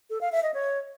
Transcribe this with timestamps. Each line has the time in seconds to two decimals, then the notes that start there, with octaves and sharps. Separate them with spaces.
0.10 A4
0.21 F5
0.32 E5
0.43 D#5
0.54 C#5